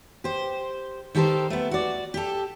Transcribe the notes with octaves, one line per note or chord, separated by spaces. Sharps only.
G4 C5
D#3 G4 A4 A#4 C5
A3 B3
F#4 D5
G4 A4